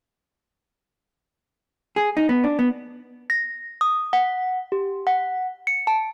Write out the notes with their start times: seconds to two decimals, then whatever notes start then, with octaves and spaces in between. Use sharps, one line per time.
1.96 G#4
2.17 D#4
2.29 B3
2.44 D4
2.59 B3
3.30 A#6
3.81 D#6
4.13 F#5
4.72 G4
5.07 F#5
5.67 C#7
5.87 A5